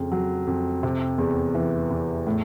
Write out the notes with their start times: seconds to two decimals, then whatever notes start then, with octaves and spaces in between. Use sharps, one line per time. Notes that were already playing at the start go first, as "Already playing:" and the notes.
Already playing: F2 C#3
0.12 F#3
0.47 F2
0.83 C3
1.18 E2
1.55 E3
1.90 E2
2.27 A2